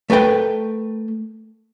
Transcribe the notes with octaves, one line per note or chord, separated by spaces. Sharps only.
A3 A#4 B4 G5